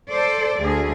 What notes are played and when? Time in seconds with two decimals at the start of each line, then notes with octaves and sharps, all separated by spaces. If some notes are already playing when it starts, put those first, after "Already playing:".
0.10 A4 C5 D5
0.60 D2 G#4